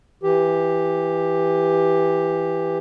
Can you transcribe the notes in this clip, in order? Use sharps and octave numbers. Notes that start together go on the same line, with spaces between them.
E3 G4